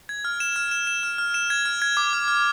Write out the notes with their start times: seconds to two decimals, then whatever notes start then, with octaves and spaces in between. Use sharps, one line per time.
0.09 G#6
0.25 F6
0.40 E7
0.56 F6
0.71 E7
0.87 E7
1.03 F6
1.18 F6
1.34 E7
1.50 G#6
1.66 F6
1.82 G#6
1.97 D6
2.13 F6
2.28 F6